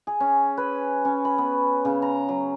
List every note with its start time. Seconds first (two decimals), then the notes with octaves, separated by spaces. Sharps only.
0.07 G#4
0.20 C#4
0.57 B4
1.05 C#4
1.25 B5
1.38 B3
1.85 C#3
2.02 A#5
2.29 F#3